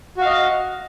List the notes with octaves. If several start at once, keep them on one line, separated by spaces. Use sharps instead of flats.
F#4 D#5 F5